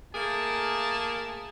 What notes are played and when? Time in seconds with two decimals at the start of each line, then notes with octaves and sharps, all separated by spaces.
0.15 A3 A#3 G#4 A#4 A5